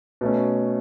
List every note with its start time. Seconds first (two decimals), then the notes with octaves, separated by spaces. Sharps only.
0.21 B2 A3 C#4